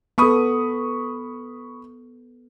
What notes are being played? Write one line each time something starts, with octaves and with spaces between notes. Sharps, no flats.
B3 A4 B5 C#6 D#6